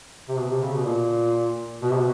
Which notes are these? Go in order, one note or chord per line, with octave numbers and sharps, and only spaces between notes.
C3
B2
C3
C#3
B2
A#2
B2
C3
B2